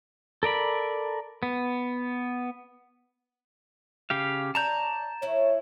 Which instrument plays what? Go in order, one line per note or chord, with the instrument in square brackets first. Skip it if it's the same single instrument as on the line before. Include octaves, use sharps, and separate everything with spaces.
[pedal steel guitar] A4 A#4 D5 B5
B3
C#3 G4 F5
[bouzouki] C#5 D5 [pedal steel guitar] A5 A#5 G6
[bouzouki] E3 E4 [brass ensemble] C#5